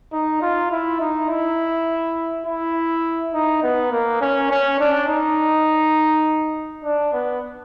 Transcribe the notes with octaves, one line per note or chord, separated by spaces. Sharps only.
D#4
F4
E4
D#4
E4
E4
D#4
B3
A#3
C#4
C#4
D4
D#4
D4
B3